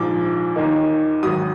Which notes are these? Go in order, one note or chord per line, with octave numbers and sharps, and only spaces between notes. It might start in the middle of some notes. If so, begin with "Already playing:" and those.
Already playing: A#1 G#2 F3 D6
D#2 D#3 A#3 D#4
G#1 G#2 F#3 D#6